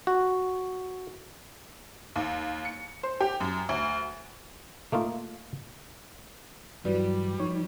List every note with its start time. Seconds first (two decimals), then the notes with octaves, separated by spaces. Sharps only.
0.07 F#4
2.16 D#2
2.65 C#7
3.03 C5
3.20 G4
3.41 F#2
3.69 D2
4.92 A3 A#3 D#4 F4
6.85 G2 E3 F#3 G3 F#4 B4 D5
7.40 F3 D#4 C#5